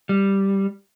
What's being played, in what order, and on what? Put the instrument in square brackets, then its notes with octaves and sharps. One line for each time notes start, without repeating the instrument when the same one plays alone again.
[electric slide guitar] G3